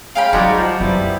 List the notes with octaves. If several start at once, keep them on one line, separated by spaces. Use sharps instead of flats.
G#3 C#4 F5 G5 B5
G#2 F#3 G3 D#4 F#4 D5
F3
F#2 F3 G3 B3 E4